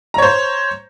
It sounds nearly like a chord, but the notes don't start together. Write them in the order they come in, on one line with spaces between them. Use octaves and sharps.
A#5 C#5 C5